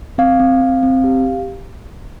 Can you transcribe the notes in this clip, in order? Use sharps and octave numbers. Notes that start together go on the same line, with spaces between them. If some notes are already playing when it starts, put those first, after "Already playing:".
C4 F5
C4
C4
C4
G4